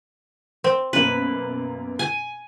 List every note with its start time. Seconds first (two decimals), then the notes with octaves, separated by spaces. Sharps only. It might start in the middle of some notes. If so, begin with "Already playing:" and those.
0.64 C4
0.93 F#2 B2 A#3 B4
1.99 G#5